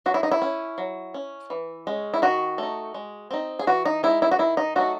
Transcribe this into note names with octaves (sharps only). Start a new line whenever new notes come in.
F#3 F#4
E4
D#4
E4
C#4
F#3
C#4
E3
G#3 C#4
E4
D#3 F#4
A3 D#4
G#3
C4 D#4
G#4
E3 F#4
D#4
G#3 D#4 E4
E4
F#4
D#3 E4
D#4
F#3 A3 D#4 F#4